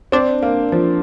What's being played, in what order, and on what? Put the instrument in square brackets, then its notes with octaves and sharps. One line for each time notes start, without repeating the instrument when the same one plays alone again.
[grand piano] C4 [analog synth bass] D4
[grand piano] A#3
F3